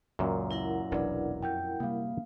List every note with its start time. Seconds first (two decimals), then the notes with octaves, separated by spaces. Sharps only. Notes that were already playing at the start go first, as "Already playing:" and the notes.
0.19 C#2 F#2 A#2
0.51 E4 A#4 F#5
0.92 E1 B1 C3 D4 B4 D5
1.43 F2 G5 G6
1.80 C3 G3 A#3 F5